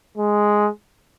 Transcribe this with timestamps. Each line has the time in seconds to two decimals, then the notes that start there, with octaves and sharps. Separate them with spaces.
0.17 G#3